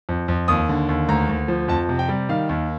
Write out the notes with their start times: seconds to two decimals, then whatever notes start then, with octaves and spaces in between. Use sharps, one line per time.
0.09 F2
0.28 F2
0.48 D#2 D#6
0.69 D3
0.89 D#2
1.09 D2 A#5
1.29 D2
1.48 F3
1.68 F2 A5
1.89 C3
1.99 G5
2.09 G3
2.29 D#3 F5
2.49 D#2